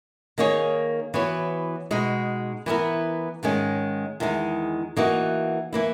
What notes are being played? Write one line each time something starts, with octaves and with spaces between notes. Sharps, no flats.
D#3 A#3 D#4 G#4 C#5
E3 B3 F#4 C#5
B2 G#3 D#4 F#4
E3 B3 E4 A#4
G#2 D#3 G#3 C#4
E2 D#3 G#3 D#4
E3 A#3 D#4 F#4
E3 A#3 E4